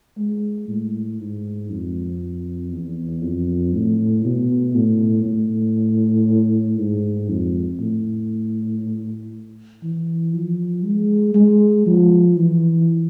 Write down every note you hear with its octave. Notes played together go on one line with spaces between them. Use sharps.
G#3
A2
G#2
F2
E2
F2
A2
B2
A2
A2
G#2
F2
A2
E3
F3
G#3
G#3
F3
E3